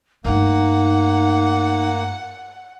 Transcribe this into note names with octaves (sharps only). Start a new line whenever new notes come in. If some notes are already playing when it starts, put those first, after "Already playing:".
G2 A3 A#3 D#4 F#5